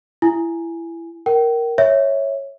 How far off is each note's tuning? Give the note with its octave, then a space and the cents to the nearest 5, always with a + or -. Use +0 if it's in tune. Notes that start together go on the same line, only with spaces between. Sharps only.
E4 +20 G#5 +0
A#4 +0 G5 -35
C#5 -10 E5 -15